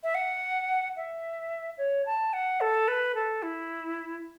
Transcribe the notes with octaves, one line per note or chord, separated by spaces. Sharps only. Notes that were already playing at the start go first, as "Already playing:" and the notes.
E5
F#5
E5
C#5
A5
F#5
A4
B4
A4
E4